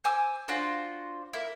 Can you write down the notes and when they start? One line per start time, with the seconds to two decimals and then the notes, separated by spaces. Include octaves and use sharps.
0.04 C5 G#5 D6 E6
0.48 D4 F4 F#4 C5
1.33 A#3 E4